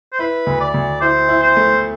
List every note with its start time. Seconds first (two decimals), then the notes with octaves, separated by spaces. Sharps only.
0.13 C5
0.19 E4 B4
0.46 D2
0.61 D5
0.74 D2
1.01 E4 C5
1.29 E4
1.43 C5
1.57 A3